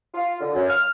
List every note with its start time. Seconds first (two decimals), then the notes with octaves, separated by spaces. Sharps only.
0.14 F4
0.40 D3
0.54 F#2
0.69 F6